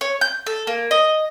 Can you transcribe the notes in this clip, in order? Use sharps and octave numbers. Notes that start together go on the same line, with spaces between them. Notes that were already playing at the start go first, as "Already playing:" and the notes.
C#5
G6
A4
A#3
D#5